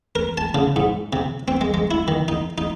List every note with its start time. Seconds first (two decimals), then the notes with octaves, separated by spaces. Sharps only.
0.15 A#4
0.38 A5
0.55 C#3
0.76 G#2
1.13 C3
1.48 C4
1.61 G#3
1.74 G#3
1.91 E4
2.08 D#3
2.28 D#4
2.58 D#4